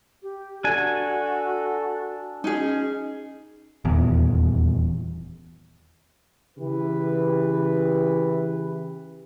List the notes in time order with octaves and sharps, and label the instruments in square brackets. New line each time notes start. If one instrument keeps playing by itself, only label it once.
[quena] G4
[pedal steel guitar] D4 G#5 [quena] F#4 [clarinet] A4
[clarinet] C#4 [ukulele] D#4 G#4
[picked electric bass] D#1 E2
[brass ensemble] C#3 E3 G4 B4